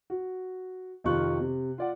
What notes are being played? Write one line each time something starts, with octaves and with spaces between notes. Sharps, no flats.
F#4
F2 C3 D#3 F4 C#6 F#6
C3
F4 D5 F#5